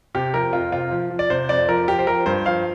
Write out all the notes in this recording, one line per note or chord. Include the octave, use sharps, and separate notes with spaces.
C3 G4
F3 A#4
F2 F4
C3 F4
F3
F3
D5
C3 C5
F2 D5
F3 A#4
F3 G4
C5
F3 A#4
G2 C5
F3 F5